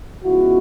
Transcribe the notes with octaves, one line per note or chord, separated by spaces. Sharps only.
C#3 F3 G#3 B3 E4 F#4